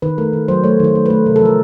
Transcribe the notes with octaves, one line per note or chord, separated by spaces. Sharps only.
D#3 B4
A3 A#4
D#3
F#3 C5
A3 C#5
D#3 C5
A3
A3 B4
C3 A#4
A4
F3 A#4